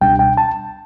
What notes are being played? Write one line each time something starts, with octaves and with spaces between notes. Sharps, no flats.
C#2 B2 G3 D4 G5
G5
A5